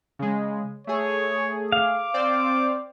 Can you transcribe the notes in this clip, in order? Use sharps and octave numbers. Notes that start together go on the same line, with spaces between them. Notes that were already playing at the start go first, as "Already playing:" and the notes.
C#3 G#3
A3 G#4 C#5
F5 D6
C4 C5 D5